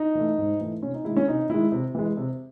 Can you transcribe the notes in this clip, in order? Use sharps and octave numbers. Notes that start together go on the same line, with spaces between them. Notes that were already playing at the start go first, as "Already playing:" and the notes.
Already playing: D#4
E3 A3
G#2
E3 A3
C3 C#4
D#4
D#3 G#3 E4
C#4
C3 D#4
D#3 G#3 E4
C3
E3 G#3
C3